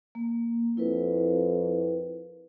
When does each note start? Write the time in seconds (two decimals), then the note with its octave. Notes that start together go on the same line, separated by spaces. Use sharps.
0.15 A#3
0.77 F2 E4 A#4 B4